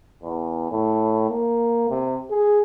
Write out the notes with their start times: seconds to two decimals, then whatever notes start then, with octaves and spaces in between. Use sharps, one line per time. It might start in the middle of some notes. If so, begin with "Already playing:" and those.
0.23 E2
0.71 A2
1.29 A#3
1.90 C3
2.30 G#4